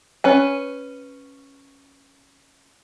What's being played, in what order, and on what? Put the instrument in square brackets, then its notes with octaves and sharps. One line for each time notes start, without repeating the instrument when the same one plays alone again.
[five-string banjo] C#4 B4 G#5